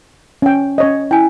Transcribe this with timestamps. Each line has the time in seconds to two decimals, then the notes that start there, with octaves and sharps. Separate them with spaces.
0.42 C#4 G5
0.78 C#4 C#5 D#5
1.11 E4 G5 G#5